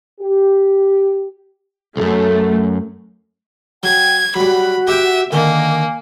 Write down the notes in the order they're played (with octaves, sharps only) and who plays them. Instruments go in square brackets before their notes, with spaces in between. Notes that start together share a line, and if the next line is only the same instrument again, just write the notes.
[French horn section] G4
[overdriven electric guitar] C2 F#2 [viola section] A3
[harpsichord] F#3 [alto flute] G5 [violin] G#6
[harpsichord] F#3 G3 [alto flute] F#4 [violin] B5
[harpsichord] G4 F#5 G5 [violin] E5
[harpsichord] D3 D#3 [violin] A#3 [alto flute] G#5